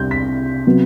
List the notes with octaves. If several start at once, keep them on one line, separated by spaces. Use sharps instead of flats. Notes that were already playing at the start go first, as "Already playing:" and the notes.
Already playing: C2 C3 G3 D4 G6
B6
C3 F#3 B3